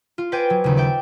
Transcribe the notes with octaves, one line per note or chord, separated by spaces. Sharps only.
F4
B4 C5 D5 G5 G#5
F#3
D#2 C#3
D5 E5 G5